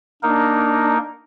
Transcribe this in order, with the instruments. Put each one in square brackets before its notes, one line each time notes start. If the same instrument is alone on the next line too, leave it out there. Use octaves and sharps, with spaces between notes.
[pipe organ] A#3 D#4 A#4 [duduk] D4